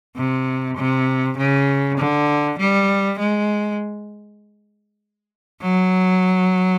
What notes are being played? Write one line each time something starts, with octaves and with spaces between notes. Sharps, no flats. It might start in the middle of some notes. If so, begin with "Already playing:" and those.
C3
C3
C#3
D3
G3
G#3
F#3